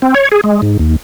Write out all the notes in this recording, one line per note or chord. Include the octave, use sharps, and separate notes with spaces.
C4
C#5
G#4
G#3
G#2
D#2